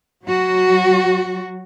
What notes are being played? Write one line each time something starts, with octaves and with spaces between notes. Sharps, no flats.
F#3 F#4